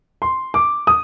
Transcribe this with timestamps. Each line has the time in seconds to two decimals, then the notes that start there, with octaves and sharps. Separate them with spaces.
0.22 C6
0.54 D6
0.87 D#6